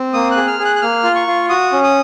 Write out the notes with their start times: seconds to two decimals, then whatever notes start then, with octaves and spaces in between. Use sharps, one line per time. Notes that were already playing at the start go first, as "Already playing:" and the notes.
Already playing: C4
0.13 A#3 D#6
0.31 F#6
0.37 G#4
0.47 F6
0.59 G#4
0.65 F#6
0.76 F#6
0.82 A#3 F6
1.03 F4
1.15 C#6
1.27 F4
1.49 F#4 D#6
1.72 C#4
1.84 D#6